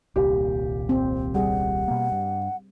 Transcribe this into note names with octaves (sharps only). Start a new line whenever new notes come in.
D#1 C2 A#2 G4
C4
G3 G#4 F#5
B2 A#3
G2